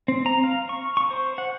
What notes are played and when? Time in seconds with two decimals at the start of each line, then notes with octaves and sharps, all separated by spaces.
0.08 C4
0.26 A#5
0.44 F5
0.69 C#6
0.97 C#6
1.10 C5
1.38 F#5